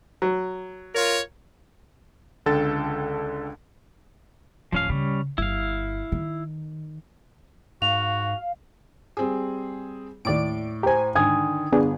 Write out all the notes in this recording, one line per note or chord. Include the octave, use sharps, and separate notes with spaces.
F#3
F4 A#4 C#5
C#2 D3 A4 G5 A6
D1 F3 C#4 F5
C#3 G3 C#4
G1 E4 F5
D#3
G#2 F#4 F5 F7
G3 C4 G#4
D#2 A2 D5 D7
G4 C5 G#5 A#5
G#2 D3 D#3 G#5 D#6 G#6
G1 B3 D4 G#4